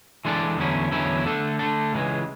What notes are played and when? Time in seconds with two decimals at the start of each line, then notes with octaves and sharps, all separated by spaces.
0.25 E3 G#3 D4 A4 D5
0.57 E2 D3 F#3 C#4 E4
0.91 E2 D3 F#3 C#4 E4
1.25 D3 A3 D4 A4
1.59 D3 A3 D4 A4
1.92 C#2 C#3 E3 G#3